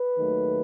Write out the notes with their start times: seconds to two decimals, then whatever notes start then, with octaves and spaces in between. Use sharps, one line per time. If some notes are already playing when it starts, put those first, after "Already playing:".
Already playing: B4
0.18 D#2 D#3 F#3 A3